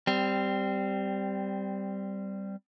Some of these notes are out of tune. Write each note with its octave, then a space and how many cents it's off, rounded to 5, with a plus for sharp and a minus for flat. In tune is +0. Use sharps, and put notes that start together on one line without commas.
G3 +0 C4 -15